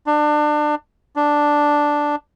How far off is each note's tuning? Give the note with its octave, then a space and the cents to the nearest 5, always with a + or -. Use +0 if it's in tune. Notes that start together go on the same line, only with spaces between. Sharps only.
D4 +25
D4 +0